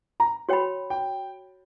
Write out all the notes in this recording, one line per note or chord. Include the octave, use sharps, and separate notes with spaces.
A#5
F#4 C#5 G5 B5
G5